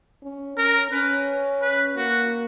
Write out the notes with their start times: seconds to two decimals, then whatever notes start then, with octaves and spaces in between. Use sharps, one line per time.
0.23 C#4
0.57 C#4 A#4
0.92 C#4 B4
1.62 B4
1.96 A#3 F#4